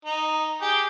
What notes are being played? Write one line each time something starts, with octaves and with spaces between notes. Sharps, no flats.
D#4
G4 G#4 G5